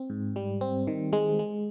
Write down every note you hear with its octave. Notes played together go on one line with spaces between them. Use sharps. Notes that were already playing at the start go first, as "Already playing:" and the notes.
Already playing: C4
G#2
G3
C4
D#3
G#3
G#3